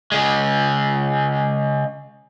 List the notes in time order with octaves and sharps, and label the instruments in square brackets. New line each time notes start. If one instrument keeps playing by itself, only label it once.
[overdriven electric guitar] C#3 G#3